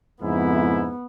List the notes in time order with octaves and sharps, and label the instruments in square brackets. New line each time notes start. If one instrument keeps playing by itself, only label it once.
[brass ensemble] F2 C#3 E4 [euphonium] G#2 [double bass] B3